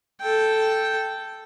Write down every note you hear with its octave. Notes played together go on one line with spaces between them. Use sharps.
A4 G5